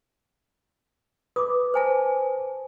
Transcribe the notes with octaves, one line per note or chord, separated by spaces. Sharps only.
B4 D6 D#6
C5 G#5 A5